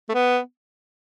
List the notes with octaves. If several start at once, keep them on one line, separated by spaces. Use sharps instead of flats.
A3
B3